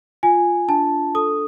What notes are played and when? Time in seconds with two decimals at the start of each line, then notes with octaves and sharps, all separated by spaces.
0.23 F4 G#5
0.68 D4 A5
1.15 A4 D#6